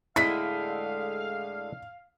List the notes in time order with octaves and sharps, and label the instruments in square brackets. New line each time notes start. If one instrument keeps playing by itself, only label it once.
[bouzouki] A2 D3 G#3 [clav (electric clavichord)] E4 [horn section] F5 [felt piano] B6